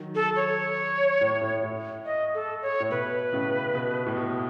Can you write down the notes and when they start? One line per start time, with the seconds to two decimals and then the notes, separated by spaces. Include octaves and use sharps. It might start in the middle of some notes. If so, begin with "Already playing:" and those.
Already playing: D#3 F#3
0.15 A4
0.36 C#5
1.21 A2
1.41 A2
1.63 A2
2.05 D#5
2.34 A4
2.62 C#5
2.80 A2
2.90 B2 B4
3.32 A2 C#3
3.75 B2
4.06 A2
4.17 B2